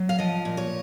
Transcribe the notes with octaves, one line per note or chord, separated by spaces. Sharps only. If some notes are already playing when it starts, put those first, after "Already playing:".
Already playing: F#3
F5
F3 D#5
A#2
C#5